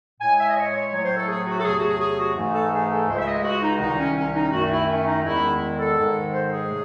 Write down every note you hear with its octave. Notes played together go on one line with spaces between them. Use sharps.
A2 G#3 G#5
E5
D#5
C#5
C#5
A2 F#3 A3 C#5
C5
A4
G#4
F#4
A4
E2 C3 F#3 A3 G#4
F#4
G#4
G#4
F#4
G#2 E3 A3
A4
G#4
A4
C#2 C#3 G#3 C5
E5
D#5
F#4
D#4
C2 C3 D#3 D#4
C#4
C#4
D#4
F#2 D#3 A3 F#4
E4
C#4
D#4
E2 D#3 G#3 E4
A4
G#2 D#3 G#3
C5
G#4
C3 F#3 A3